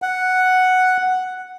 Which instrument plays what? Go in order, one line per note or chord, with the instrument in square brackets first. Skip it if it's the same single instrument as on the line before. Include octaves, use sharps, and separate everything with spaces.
[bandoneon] F#5